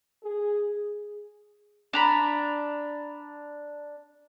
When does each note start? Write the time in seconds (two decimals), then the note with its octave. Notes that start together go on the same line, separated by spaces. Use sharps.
0.23 G#4
1.93 D4 A#5 B5